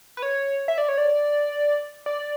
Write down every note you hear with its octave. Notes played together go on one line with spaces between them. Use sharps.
B4
C#5
E5
D5
C#5
D5
D5